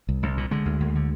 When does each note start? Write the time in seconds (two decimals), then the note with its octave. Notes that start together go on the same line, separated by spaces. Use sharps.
0.09 C2
0.23 C2
0.37 A#2
0.51 D3 G#3
0.66 D2
0.80 D2
0.95 D3